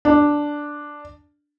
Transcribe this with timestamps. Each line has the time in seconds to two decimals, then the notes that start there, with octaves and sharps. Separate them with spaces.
0.05 D4